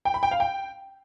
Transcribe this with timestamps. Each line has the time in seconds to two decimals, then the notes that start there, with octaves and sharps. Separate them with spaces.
0.05 G5
0.14 B5
0.23 G5
0.31 F5
0.40 G5